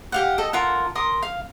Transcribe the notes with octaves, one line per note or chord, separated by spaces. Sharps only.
G4 F5 F#5
A4 D#5
F4 A4 A#4 F#5
A#4 C6 D#6
F5